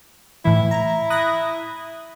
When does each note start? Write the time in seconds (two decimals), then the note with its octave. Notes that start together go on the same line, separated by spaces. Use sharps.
0.45 A2 E3 E4
0.71 A#5
1.10 D#6 F#6 A#6